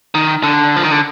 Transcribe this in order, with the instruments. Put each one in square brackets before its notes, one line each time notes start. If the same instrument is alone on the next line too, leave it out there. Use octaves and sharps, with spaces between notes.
[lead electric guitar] D#3
D3
F3
D#3
D3